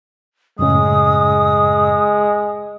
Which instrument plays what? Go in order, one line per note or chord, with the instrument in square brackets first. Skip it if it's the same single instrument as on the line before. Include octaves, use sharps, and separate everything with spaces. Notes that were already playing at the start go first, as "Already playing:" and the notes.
[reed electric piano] F#2 A2 C#3 [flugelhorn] G#3 [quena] D#6